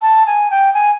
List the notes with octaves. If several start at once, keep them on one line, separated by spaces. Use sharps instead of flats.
A5
G#5
G5
G#5